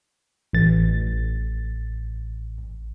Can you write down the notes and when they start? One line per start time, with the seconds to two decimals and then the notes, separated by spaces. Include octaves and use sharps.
0.53 A1 A6